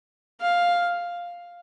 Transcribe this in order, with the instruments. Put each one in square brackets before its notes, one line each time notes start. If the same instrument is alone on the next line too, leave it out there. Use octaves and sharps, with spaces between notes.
[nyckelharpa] F5